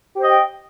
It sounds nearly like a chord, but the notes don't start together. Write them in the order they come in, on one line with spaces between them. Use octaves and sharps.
G4 C5 D#5 G5